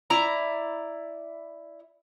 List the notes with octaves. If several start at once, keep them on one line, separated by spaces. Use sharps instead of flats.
E4 D5 A#5